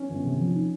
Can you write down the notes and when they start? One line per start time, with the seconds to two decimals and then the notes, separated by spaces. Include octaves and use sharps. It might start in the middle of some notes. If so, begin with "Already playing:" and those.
Already playing: C#4
0.09 G1
0.24 C3
0.39 F3
0.55 D#4